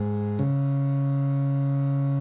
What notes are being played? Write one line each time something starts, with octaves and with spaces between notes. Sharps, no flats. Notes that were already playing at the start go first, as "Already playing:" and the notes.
Already playing: G#2
C#3